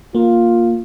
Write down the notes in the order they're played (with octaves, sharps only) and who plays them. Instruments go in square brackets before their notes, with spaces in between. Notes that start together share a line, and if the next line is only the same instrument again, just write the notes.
[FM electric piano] A#3 [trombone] F4